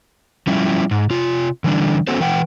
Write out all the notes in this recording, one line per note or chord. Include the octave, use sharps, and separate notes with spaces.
F3 G3 C#4 E4
G#2
C3 F4
D3 E3 G3 D4
B3 C#4 F#4 A4 C5
E3 B4 F#5 G5